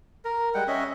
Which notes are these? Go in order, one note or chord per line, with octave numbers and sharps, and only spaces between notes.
A#4
G3 G#3 F#5 G5
C#4 D#5 E5